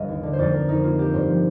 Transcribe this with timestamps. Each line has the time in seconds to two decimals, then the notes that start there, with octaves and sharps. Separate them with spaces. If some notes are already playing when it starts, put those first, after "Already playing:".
Already playing: G1 D#5 F5
0.08 D#2
0.23 D3
0.33 C5
0.38 F2 D5
0.53 F2 A#4
0.68 F2 D#4
0.83 A#3 F4
0.98 A#3 G4
1.14 G2 C5
1.28 F3